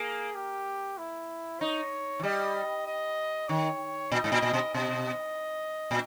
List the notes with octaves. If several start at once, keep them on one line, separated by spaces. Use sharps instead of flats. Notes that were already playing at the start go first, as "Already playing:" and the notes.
Already playing: A#3 G#4
G4
E4
D#4 C#5
E3
G3 D#5
D#5
D#3 C#5
A#2 D#5
G#2
A#2
A#2
B2
B2 D#5
A#2